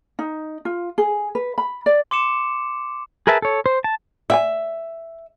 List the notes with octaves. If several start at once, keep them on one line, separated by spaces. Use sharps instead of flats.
D#4
F4
G#4
B4
B5
D5
C6 D6 C#7 E7
G#4 A#4 B4 E5 A5
A4 C#5
C5
A5
D5 E5 G5 G#5